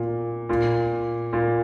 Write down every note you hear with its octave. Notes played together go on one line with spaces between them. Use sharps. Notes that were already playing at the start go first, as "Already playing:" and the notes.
Already playing: A#2
A#2
A#2